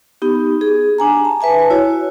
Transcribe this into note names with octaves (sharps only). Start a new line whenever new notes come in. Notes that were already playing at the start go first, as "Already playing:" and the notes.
B3 D#4 G4
G#4
D4 G#5 A#5
A5
B4 E5 G#5 A5
E4 F#4 C#5